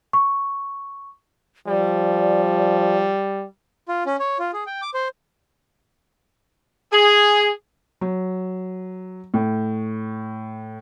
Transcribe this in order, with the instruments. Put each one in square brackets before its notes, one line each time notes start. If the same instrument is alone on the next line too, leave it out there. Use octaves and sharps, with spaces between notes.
[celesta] C#6
[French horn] F3 [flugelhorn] G3 [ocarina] D5
[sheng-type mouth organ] F4
C#4
C#5
F4
G#4
G5
D6
C5
[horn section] G#4
[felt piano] F#3
A2